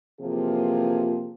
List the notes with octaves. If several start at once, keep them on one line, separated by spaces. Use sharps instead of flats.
C3 E3 F3 A#3 F4 G#4